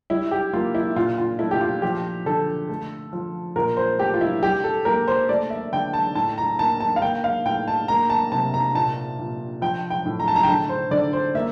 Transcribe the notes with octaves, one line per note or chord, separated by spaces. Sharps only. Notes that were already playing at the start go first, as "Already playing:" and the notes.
G3 E4
G4
A#3 F4
E4
A#2 F4
F4
A3 E4
G4
F4
F3 G4
D3 A4
A3
F3
A#2 A#4
C5
A3 G4
F4
E4
G3 G4
A4
A#3 A#4
C5
A3 D5
E5
D3 G5
A5
A2 A5
A#5
A#3 A5
A5
F5
A#3 G5
F5
A2 G5
A5
A#3 A#5
A5
C3 A5
A#5
A#2 A5
A#2
F3 G5
G5
A2
A#5
A5
A#5
G5
D3 A5
C5
D3 D5
C5
A#3 E5